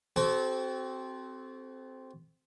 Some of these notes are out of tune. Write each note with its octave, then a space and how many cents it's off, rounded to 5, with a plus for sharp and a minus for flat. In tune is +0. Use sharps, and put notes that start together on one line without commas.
C4 +0 F#4 +30 A4 -25